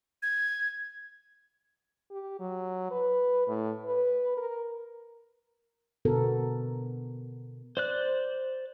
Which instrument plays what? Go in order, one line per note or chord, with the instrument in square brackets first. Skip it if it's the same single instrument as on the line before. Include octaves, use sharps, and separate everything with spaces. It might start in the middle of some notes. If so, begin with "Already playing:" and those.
[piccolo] G#6
[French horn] G4
F#3
B4
A2
B4
A#4
[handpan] B2 D3 B3 F#4 A4 A#4
[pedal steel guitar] C5 D5 F#6